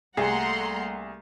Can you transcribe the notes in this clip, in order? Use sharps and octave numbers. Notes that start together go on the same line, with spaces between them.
C2 G3 A3 A#3 G#4 F#5 A#5 C6